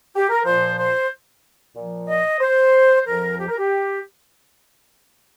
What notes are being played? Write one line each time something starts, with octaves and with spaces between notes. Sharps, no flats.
G4
A#4
A#2 F3 C5
C5
A#2 F3
D#5
C5
F2 F3 A#4
G4
A#4
G4